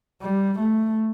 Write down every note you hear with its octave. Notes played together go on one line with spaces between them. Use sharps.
G3
A3